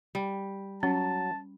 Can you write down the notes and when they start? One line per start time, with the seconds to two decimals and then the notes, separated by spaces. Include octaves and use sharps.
0.15 G3
0.83 F#3 C#4 A5